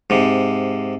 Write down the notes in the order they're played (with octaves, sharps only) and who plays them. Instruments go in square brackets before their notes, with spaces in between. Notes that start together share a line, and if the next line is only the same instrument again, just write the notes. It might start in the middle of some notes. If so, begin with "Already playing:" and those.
[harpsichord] G#2 C3